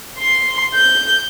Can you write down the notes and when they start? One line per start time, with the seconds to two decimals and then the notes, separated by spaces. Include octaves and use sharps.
0.19 C6
0.74 G6